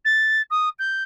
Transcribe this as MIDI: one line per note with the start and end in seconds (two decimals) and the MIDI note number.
0.05 0.42 93
0.50 0.69 87
0.79 1.03 91